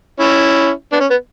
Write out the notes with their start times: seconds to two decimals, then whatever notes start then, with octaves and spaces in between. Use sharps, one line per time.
0.20 C#4 E4
0.92 B3 D4
1.00 C#4
1.10 B3